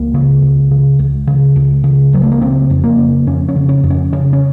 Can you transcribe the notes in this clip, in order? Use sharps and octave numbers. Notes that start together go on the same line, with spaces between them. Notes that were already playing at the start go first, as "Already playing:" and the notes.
Already playing: C#2 A#3
C#3
C#2
C#3
C#2
C#3
C#2
C#3
C#2 F#3
A3
A#3
C#3 C4
F2
A#3
C#3
F2 C#4
C#4
C#3
C#4
F2
C#4
C#3 C#4
C#4